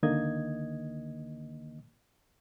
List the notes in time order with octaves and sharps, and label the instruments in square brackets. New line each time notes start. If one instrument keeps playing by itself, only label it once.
[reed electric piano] C#2 D3 D#3 A#3 D#5 G#6